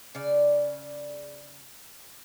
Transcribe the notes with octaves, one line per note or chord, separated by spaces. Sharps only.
C#3 D5